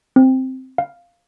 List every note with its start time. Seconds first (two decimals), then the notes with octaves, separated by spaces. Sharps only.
0.16 C4
0.78 F5